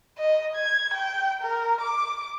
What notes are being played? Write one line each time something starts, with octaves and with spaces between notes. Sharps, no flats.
D#5
G#6
G5
A#4
D6